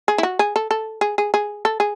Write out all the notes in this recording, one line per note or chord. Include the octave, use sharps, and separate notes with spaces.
G#4
E4
F#4
G#4
A4
A4
G#4
G#4
G#4
A4
G#4